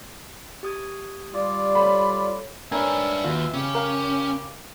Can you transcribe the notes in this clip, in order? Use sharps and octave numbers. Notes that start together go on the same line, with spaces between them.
G4 D#6 G#6
G3 F4 D5
A4 C#5 B5
D4 A#4 B4 C#5 E5 G#5
D#2 F4 F#4 B4
C#3 C#4 G4
A#4 F5